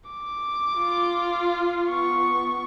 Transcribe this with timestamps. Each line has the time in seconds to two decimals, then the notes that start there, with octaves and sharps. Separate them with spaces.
0.10 D6
0.77 F4
1.89 B3 C#6